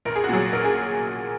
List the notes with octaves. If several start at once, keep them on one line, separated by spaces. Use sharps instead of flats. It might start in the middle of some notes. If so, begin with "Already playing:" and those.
A#1 A#4
G#4
F#4
A#2 F#3 G#4
A#1 A#4
G#4